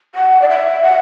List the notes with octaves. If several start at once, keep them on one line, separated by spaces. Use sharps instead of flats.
F#5
D5
E5
F#5